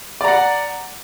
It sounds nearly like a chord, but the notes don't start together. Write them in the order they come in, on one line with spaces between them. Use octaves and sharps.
D5 A#5 F#5